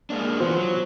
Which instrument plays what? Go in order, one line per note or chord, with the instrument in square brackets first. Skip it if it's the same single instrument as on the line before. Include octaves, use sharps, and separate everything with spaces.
[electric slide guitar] G#3 A#3 D4
[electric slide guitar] E3 B3 [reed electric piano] F4 F#4 C5
[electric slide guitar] F#3